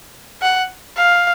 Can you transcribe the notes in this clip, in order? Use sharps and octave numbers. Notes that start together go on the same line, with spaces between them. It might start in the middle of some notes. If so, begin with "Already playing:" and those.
F#5
F5